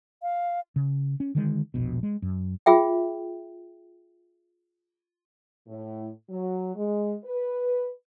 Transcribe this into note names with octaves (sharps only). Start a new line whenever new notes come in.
F5
C#3
C#4
D3 D#3 G#3
E1 A#1 B2
G#3
F#2
F4 G#4 E5 G5
A2
F#3
G#3
B4